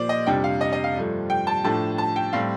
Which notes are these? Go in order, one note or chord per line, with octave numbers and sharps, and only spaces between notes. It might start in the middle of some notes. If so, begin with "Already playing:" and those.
Already playing: A#2 F3 A#3 C5 D5
D#5
F2 C3 G3 D4 G5
F5
D#5
D#5
F5
G2 F3 A3
G5
A5
A2 F3 A3 D4 A5
A5
G5
A2 G3 C4 F5